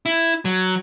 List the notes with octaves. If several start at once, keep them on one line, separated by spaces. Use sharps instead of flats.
E4
F#3